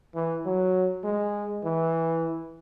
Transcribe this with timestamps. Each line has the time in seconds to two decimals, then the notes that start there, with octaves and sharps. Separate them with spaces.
0.15 E3
0.46 F#3
1.05 G#3
1.65 E3